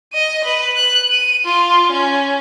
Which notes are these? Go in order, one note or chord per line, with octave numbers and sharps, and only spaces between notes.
D#5 D#7
B4
F#6
D#7
F4
C#4